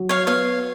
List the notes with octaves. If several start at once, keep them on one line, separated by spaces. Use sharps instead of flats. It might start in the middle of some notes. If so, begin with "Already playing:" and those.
Already playing: F#3
C#5 F5
B3 C#5 F5